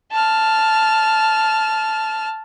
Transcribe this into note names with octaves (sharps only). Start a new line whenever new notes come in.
A5 F6